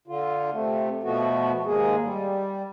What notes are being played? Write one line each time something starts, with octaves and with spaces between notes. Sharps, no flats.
D3 F4
C3 A3
B2 F3 A3 B3 F#4
D#2 G#2 G#3 A#3 G#4
G3